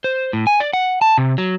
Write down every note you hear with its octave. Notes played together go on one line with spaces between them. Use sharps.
C5
A2
G#5
D5
F#5
A5
C3
F#3